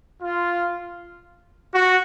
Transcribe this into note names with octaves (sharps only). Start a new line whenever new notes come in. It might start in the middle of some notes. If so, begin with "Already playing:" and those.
F4
F#4